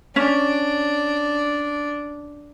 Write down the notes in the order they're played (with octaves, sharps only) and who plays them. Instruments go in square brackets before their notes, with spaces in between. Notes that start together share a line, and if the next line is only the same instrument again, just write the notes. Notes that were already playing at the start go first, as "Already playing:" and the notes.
[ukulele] C#4 [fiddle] D4